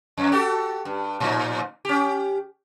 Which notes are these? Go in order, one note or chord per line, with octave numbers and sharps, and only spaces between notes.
F2
F#4 G4 A4
G2
A2 F3 D#4
C#4 G4